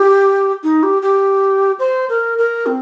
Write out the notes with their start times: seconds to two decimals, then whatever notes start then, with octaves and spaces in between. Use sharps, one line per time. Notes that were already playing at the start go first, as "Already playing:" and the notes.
Already playing: G4
0.63 D#4
0.83 G4
1.02 G4
1.79 C5
2.10 A#4
2.38 A#4
2.66 C4